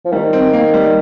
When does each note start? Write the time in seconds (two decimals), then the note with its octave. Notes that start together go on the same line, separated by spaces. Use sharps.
0.05 F3
0.12 D#3 G3
0.33 C4
0.53 A#3
0.74 G3